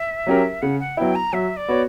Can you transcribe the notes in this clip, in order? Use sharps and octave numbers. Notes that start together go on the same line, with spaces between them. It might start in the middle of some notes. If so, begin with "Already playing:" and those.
Already playing: E5
F#3 C#4 G4 A#4
C#3 F#5
F#5
F#3 B3 E4 G5
A#5
F#3 E5
D5
B3 F#4 C#5